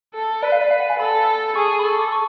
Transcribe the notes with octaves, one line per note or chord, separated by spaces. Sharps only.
A4
B4 D5
F5
D5
F5
F#5
G#5
A4 B5
G#4 C#6
B5
A4 C#6
D6
C#6